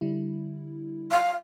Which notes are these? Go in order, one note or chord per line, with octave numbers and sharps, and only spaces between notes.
D3 G3 E4
F5